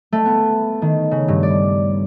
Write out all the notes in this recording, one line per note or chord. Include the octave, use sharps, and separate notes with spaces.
A3
B3
D#3
C#3
G2
D5